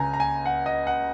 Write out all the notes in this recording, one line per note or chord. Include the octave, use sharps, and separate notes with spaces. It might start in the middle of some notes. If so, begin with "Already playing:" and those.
Already playing: C#2 C#3 G#5 A#5
A#5
G#5
F#5
D#5
F#5